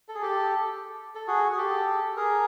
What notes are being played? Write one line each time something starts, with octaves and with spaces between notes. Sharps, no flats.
A4
G#4
G4 A4
A4
F#4 G#4
G#4
G4 A4
G#4 A#4